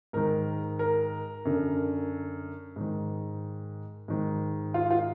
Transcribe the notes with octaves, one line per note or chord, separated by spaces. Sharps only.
G#2 D#3 A#4
A#4
F#2 D3
G#2 D#3
G#2 D#3
F4
F4